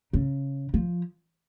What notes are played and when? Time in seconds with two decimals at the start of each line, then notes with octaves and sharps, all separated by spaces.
0.13 C#3
0.74 F3